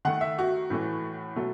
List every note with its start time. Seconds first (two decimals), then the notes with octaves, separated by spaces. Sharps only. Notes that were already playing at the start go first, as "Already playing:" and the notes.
0.05 D#3 A3 F#5
0.21 E5
0.39 F#4
0.70 A2 E3 A3
1.36 B2 F#3 A3